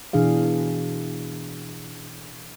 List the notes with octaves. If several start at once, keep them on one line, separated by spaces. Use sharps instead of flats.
B2 E3 D4 G#4 F5